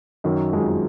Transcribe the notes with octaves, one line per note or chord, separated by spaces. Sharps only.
F#2 D#3 F#3
F2 F3 G#3